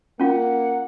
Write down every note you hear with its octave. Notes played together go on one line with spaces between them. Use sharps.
A#3 C#4 F4 F#5